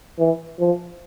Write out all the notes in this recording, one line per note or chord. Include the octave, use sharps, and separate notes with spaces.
E3
F3